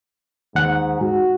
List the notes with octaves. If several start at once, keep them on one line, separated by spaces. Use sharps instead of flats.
D#2 G#2 F#5
G#2 F#4